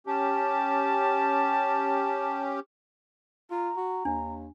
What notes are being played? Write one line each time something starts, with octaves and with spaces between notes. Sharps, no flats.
C#4 G4 A5
F4 A#5
F#4
D#2 D4